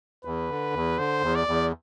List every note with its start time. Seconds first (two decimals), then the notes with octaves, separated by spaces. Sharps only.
0.24 E2 B4
0.50 D3
0.74 E2
0.98 D3 C5
1.22 E2
1.35 D5
1.47 E2